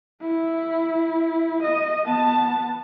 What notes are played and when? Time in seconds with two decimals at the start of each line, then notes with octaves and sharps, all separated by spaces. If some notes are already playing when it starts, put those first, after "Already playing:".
0.22 E4
1.62 D#5
2.04 B3 A5